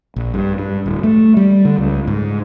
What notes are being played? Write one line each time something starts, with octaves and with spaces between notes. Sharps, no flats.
A#1
G2
G2
D1
A3
G3
D3
C#2
G#2